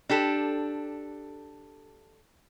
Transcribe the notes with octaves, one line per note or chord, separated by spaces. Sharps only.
D4 G4 A4